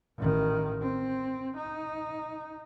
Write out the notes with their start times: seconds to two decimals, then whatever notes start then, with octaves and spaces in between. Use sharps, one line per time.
0.18 A1 D#3
0.82 C4
1.57 D#4